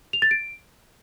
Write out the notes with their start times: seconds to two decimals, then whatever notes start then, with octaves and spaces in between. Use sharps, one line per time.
0.13 F7
0.22 A6
0.31 D7